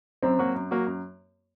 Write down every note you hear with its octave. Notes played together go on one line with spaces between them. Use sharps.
F#2 C4
F#3 A#3 F#4
F#2
F#3 A#3 F#4
F#2